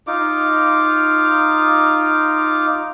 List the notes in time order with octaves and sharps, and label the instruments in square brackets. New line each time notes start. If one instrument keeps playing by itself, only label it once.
[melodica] D#4 F4 D6